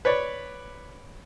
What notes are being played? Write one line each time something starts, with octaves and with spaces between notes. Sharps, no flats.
B4 C#5 D5